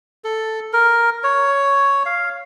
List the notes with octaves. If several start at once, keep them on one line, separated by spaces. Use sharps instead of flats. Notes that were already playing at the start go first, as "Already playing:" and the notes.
A4
A#4
C#5
F5